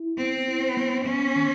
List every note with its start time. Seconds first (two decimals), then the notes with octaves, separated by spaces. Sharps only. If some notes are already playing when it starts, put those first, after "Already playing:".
Already playing: E4
0.17 B3 C4
0.48 E4
0.77 B3
1.06 B3 C#4
1.36 D#3